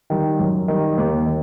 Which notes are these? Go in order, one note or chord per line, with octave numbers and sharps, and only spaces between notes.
D#3 G3
F#2
D#3 G3
D#2
D#3